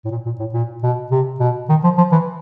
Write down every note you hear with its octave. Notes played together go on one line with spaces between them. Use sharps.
A2
A#2
A#2
A2
A#2
B2
C3
B2
D#3
F3
F3
E3